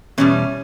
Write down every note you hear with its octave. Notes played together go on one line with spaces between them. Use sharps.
E2 B2 G3 C#4